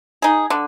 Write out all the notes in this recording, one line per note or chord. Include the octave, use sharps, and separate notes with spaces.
D#4 G#4
D3